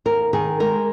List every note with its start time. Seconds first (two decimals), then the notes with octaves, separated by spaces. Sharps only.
0.05 D#2 A#4
0.33 D#3 G#4
0.60 G#3 A#4